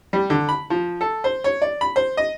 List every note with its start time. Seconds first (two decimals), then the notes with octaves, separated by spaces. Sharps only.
0.13 G3
0.30 D3
0.49 B5
0.70 F3
1.01 A4
1.24 C5
1.44 C#5
1.62 D5
1.81 B5
1.96 C5
2.17 D#5